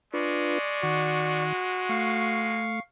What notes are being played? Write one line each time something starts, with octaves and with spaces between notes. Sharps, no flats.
G#3 D4 F4 B4 D5 C#6
D#3 F#4
A3 F5 C#6